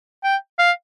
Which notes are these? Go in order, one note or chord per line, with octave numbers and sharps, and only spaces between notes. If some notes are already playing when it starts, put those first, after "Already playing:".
G5
F5